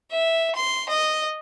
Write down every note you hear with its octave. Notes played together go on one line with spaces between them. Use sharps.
E5
C6
D#5